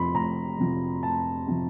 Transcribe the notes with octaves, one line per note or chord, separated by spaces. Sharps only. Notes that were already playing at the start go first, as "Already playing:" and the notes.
Already playing: F1 F2 C3 F3 B5 C6
F1 A#5
F2 C3 F3
F1 A5
C3 F3